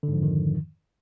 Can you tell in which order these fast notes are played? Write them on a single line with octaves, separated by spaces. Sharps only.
D3 G#2 F3 F2 D#3